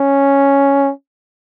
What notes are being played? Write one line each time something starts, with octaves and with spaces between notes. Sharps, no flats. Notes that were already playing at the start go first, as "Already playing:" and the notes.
Already playing: C#4